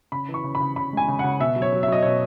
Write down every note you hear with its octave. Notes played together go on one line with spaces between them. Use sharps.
C#3 B5
E3
C#6
C#3
B5
C#3
C#3 B5
G#3 G#5
C#3
C#3 F#5
B2 E5
F#3
C#5
F#3
E5
F#3 D#5
B2 C#5